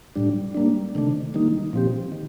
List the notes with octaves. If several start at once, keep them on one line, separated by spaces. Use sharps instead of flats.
A2 G3 D4
G3 A#3 D4
C3 D#3 A3 D4
D#3 G3 A#3 D#4
A#2 F3 C4 G4
D#3